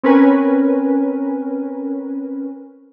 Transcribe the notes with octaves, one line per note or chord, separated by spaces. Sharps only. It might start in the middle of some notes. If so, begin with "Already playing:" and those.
C4 C#4 A#4 B4 G#5